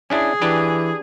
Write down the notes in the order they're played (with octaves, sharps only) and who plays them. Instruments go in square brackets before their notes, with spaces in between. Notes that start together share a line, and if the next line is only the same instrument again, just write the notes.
[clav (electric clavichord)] C#4 D4 E4 [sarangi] G#4
[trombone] E3 [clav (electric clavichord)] D4 G4 B4